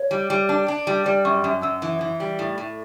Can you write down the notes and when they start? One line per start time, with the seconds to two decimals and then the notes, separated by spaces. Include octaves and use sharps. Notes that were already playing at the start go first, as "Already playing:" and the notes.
Already playing: C#5
0.11 G3
0.30 G3
0.49 D4
0.68 D4
0.87 G3
1.06 G3 D5
1.25 F#2 C#6
1.44 F#2
1.62 F#2 E6
1.82 E3
2.01 E3
2.20 G3
2.39 A2
2.58 A2